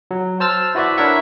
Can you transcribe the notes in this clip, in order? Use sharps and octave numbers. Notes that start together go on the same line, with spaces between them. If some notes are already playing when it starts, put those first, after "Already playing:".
F#3
C5 A5 E6 F6 A6
E4 F#4 B4 D5 E5
D4 E4 A#4 C#5 E5 F#5